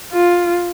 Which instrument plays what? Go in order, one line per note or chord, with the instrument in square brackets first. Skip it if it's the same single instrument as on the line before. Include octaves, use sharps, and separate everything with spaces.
[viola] F4